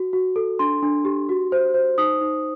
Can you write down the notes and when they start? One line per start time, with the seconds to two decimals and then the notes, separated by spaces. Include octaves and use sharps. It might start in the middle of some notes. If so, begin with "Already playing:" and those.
Already playing: F#4
0.13 F#4
0.36 A4
0.59 D4 C6
0.83 D4
1.05 G4
1.29 F#4
1.52 C5
1.74 C5
1.98 D#4 D#6
2.21 D#4